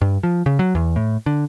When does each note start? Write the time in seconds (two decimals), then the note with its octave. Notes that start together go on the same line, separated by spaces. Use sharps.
0.01 G2
0.23 F3
0.46 C#3
0.59 F#3
0.75 E2
0.96 A2
1.26 D3